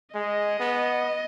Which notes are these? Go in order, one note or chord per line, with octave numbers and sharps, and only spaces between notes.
G#3 D#5
B3